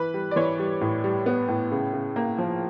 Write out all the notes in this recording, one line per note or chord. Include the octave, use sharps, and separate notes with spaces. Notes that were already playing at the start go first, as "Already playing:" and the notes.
Already playing: E3 B4
G3
D5
E3 C#5
G3
A2
G3
B3
A2
C#3
C#3
A#3
F3